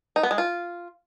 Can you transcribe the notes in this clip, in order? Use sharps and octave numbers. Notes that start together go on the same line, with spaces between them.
D#4
B3
G#3
F4